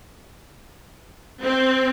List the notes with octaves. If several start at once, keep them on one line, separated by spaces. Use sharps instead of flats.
C4